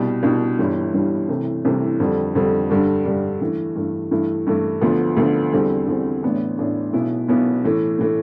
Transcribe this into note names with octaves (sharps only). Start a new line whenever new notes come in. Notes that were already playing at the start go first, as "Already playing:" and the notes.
Already playing: C2 B2 G3
C2 B2 G3
G1 G2 E3 G3
G1 G2 E3 G3
C2 C3 E3 A3
C2 C3 E3 A3
F2 D3 G3
F2 D3 G3
G2 D3 G3 D4
G2 D3 G3 D4
G2 E3 A3
G2 E3 A3
G2 E3 A3 E4
G2 E3 A3 E4
D2 D3 F3 B3
D2 D3 F3 B3
E2 D3 G3 C4
E2 D3 G3 C4
A1 A2 E3 B3 D4
A1 A2 E3 B3 D4
B1 B2 B3 E4
B1 B2 B3 E4
A2 E3 A3
A2 E3 A3